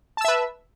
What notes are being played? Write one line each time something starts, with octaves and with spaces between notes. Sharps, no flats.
B4 E5 A5 E6